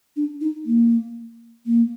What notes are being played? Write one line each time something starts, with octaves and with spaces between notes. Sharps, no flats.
D4
D#4
A#3
A#3